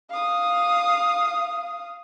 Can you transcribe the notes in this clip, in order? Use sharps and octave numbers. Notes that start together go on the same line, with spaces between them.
F5 D#6